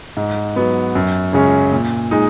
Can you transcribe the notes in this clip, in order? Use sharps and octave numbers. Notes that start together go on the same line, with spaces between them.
G#2
F#3 B3
F#2
C#3 G#3 C#4
A#2
G#3 D#4